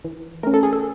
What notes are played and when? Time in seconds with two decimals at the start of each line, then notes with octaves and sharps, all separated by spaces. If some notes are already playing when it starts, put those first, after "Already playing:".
0.04 E3
0.43 A3 C#4 A#4
0.54 A4
0.63 G#4
0.73 A4